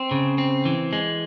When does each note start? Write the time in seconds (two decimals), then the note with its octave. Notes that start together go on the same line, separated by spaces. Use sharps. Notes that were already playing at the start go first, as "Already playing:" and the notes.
Already playing: C4
0.11 C#3
0.38 C4
0.65 E3
0.93 G#3